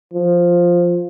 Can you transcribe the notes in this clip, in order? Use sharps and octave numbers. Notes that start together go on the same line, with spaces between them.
F3